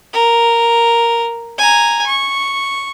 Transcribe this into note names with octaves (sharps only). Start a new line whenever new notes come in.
A#4
G#5 A#5
C#6